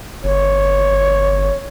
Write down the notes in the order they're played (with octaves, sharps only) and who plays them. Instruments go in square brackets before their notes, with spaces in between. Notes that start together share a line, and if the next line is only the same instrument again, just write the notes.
[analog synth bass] G1 [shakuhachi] C#5